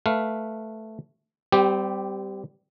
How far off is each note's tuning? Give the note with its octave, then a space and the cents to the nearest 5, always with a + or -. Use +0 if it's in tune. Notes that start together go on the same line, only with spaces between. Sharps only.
A3 +0 B4 +0 F5 +0
G3 -5 C4 -35 G4 +0